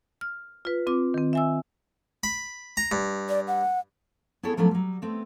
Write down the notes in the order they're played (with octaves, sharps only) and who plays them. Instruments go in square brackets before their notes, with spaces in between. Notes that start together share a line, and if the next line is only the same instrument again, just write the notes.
[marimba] F6
F4 B4
C4 F4 D6
D#3 C4
E5 G#5 E6
[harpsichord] B5
A#5
G2
[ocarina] D5
F#5
[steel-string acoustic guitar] B3 E4 G#4 A4 C#5
F3 F#3 A3 B3 C#4 D4
F#3 G3
A3 B3 C4